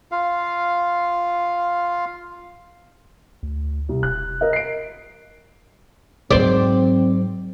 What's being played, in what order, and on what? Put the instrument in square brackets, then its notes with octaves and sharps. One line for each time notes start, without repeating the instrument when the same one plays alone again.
[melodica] F4 F5
[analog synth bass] D2
[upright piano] C2
[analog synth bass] E1 [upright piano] F#6
[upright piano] A#4 D#5
C7 D7
[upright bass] G#2 F#3 [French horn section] C4 [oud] C5 D5